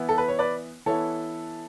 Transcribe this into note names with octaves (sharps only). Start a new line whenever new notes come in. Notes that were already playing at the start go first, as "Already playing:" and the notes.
Already playing: E3 B3 E4
A4
B4
C#5
B4 D5
E3 B3 E4 A4 C#5